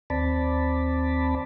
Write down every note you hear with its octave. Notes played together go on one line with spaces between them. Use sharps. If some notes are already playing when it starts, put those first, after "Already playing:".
D#2 C4 D5 A5 B5